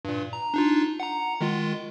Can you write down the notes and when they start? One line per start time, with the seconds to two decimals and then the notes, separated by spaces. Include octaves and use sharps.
0.05 G2 A#2
0.33 A#5
0.54 D4 D#4 F4
1.00 F#5 A#5
1.41 D#3 G#3 F4